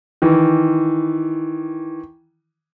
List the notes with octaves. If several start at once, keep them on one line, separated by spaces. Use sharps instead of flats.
D#3 E3